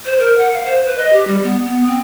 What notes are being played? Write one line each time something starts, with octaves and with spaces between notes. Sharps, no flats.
C5
A#4
F#5
F5
C5
B4
D#5
G4
G3
B3
B3
C4